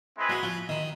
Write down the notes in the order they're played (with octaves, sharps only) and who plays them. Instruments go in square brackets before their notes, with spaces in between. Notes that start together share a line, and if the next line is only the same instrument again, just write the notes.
[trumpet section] G#3 C4 E4 G#4 B4
[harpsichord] F#3
F3
D#3